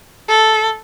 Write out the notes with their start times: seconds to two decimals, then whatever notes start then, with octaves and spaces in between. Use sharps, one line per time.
0.29 A4